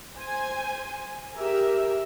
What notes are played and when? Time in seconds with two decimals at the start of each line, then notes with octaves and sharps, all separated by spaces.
0.16 C5 G#5
1.37 G4 G#4 A#4 E5